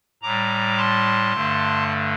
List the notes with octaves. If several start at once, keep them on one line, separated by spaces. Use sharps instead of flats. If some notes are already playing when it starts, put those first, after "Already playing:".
A2 G3 A#5 D6
A5 C6
G2 D3 A3